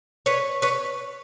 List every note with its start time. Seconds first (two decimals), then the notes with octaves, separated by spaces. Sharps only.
0.26 B4 C#5
0.62 B4 C#5